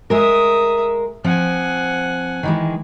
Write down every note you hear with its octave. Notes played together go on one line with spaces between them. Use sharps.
G#3 A#4 E5 D#6
F3 C4 F#5 G#5
D#3 E3 G#3